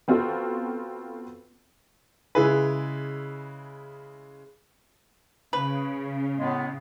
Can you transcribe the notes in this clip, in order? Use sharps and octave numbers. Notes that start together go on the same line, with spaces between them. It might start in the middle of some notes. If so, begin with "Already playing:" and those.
B3 C4 F4 F#4 A4
C#3 G#3 E4 G#4 B4
C#3 B4
A2 G#3 B3